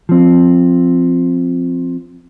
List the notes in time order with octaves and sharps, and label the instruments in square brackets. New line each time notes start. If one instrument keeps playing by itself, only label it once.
[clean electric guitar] F3 C4